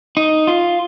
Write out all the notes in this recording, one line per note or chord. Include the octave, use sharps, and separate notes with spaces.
D#4
F4